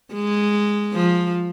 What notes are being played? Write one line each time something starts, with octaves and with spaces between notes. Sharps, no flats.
G#3
F3